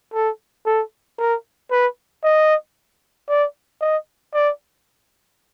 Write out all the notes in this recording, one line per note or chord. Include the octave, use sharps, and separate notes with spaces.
A4
A4
A#4
B4
D#5
D5
D#5
D5